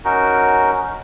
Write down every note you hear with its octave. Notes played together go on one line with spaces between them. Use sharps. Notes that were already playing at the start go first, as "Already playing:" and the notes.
C#4 D#4 F#4 A#4